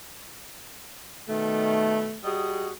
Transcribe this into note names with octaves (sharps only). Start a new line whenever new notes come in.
B2 D#3 A3
G3 F#4 G#4 D#5